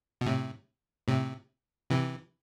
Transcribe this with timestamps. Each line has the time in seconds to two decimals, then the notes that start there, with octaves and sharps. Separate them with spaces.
0.21 B2
0.26 A2 C3
1.08 A2 C3
1.90 C3 E3